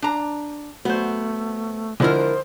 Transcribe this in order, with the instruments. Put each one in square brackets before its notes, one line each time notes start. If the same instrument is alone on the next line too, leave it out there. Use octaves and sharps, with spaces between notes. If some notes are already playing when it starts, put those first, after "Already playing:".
[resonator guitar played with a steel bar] D4 A#5
[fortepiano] F#3 [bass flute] A3 [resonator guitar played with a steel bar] B3 C5
[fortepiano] D3 F3 D4 [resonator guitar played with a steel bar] G#3 E4 A#4 [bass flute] C5